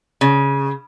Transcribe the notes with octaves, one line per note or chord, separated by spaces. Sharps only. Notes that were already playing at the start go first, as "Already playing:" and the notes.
C#3